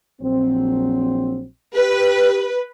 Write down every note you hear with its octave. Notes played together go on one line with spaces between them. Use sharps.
A#1 F#3 C4
G4 B4